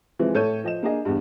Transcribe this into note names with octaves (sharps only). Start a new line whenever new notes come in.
C3 E3 F3 G#3
A2 A4 C#5 G6 D#7
F3 D#5 E7
A#3 D4 G#4 D#5
E2 G2